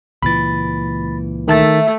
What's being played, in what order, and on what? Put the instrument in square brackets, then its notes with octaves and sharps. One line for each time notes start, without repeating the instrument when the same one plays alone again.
[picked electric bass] C#2 A#2 E3 [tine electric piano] B5 A6
[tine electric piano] D#3 A5 A6 [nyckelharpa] A3 [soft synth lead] E5